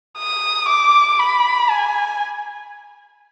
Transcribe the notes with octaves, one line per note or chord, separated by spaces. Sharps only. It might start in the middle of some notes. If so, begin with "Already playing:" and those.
D#6
D6
B5
G#5